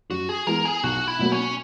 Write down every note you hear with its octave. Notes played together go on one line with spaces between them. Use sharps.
F#2 F#4
G#4
E3 G#3 B3 A#4
G#4
B1 F#4
E4
B2 F#3 A#3
C#4